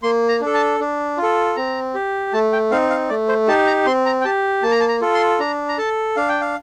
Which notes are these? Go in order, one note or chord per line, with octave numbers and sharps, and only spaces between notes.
A#3 C6
A#5
D4
A4
A5
D4
F4
A4
C4 A#5
G4
A3 A5
G5
C4 D#4 F5
F5
A3 D5
C5
D#4 G4 A5
A#5
C4 C6
A#5
G5
G4 A5
A#3 A5
A#5
A5
A#5
F4 A4
C6
D4 A#5
A#5
A4 A5
D4 F5
G5
F5